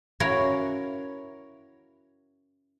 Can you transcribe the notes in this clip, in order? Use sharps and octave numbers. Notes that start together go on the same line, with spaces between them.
C#4 E4 F#4 A#4 C#5 F5